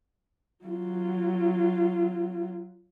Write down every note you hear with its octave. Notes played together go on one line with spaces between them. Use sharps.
F#3 F4